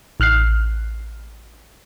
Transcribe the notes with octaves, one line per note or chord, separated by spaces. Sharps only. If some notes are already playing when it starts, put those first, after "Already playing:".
A1 F6 F#6 C7